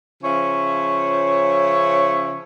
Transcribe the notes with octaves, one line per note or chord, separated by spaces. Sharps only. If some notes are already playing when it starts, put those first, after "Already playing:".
C#3 F3 C#4 C#5 E5